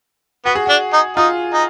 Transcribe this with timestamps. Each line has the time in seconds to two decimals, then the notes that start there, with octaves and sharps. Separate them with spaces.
0.45 B3 F#4
0.55 G#4
0.66 D4 F#4
0.93 D#4
1.17 D#4 F4
1.53 D#4